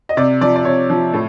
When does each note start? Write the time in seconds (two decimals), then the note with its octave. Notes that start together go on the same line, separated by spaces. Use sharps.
0.09 D#5
0.17 C3 D5
0.41 F3 D5
0.56 D5
0.65 C3 C#5
0.90 F3
1.13 A2